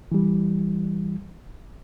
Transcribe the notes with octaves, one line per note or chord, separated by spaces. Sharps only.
E3 G3